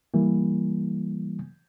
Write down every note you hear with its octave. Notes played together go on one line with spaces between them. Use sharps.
E3 G3 A#3